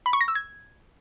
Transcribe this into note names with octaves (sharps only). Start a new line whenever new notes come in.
B5
C#6
A#6
E6
G#6